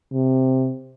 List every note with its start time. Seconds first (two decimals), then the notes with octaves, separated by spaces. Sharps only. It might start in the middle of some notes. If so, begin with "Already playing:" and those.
0.12 C3